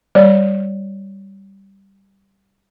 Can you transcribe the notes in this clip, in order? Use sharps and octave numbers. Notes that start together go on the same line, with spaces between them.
G3 C#5 D5